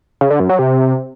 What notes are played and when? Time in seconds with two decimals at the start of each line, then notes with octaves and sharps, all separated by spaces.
0.21 C#3
0.31 D3
0.40 F#2
0.49 F#3
0.59 C3